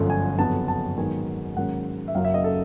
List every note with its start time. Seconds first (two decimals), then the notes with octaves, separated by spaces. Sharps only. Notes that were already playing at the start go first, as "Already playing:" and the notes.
Already playing: G1 F#2 D3 F3 A3
0.10 G#5
0.38 F#1 F2 D3 F#3 B3 A5
0.68 A5
0.98 G#2 D#3 F#3 B3 G#5
1.56 G#2 D#3 F#3 A#3 C#4 F#5
2.08 E5
2.15 F#1 F#2 C#3 F#3 A#3 F5
2.25 E5
2.34 D#5
2.44 A4